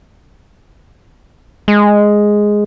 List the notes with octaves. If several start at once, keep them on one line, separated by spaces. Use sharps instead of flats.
G#3